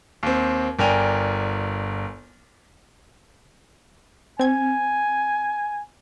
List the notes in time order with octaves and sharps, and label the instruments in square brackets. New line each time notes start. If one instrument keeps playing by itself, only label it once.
[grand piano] D#2 C4
G1 D4 A#4 G5 G#5 F7
[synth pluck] C4 G#6 [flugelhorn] G#5